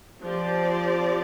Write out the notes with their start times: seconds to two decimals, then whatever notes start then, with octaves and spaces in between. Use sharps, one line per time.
0.22 F3 C4 G4 D5